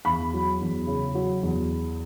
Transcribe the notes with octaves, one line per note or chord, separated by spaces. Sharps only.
E2 B5
F#3
E2
C#3
F#3
E2